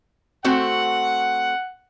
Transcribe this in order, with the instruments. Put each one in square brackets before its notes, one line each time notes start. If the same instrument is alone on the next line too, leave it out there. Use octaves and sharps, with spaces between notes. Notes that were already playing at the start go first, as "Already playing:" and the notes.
[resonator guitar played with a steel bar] A3 C4 F#4 [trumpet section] F#5